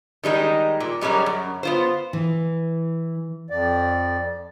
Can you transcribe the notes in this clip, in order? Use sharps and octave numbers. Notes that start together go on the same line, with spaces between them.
D#3 G3 G#3 D#4
A#2
F#2 G3 G#3 C#4 A#4
F#2
B3 F4 C5
E3
F2 D5